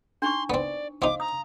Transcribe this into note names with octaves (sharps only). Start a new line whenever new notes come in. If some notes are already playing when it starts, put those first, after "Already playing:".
D4 D#4 C6 C#6
B3 C4 D5
C4 D#4 F5 D6
A#5 D#6